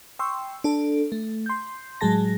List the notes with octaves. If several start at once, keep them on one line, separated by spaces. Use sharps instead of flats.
G5 C6 C#6 E6
D4 A4
A3
C6 G6
A2 F#3 G#3 G#4 A5 A#6